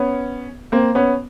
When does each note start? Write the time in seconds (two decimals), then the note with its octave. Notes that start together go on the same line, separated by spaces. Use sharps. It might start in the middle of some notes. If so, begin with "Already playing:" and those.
Already playing: B3 C#4
0.72 A#3 C4
0.95 B3 C#4